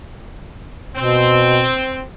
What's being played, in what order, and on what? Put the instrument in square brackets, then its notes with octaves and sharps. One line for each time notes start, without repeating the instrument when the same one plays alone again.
[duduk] B2 [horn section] C4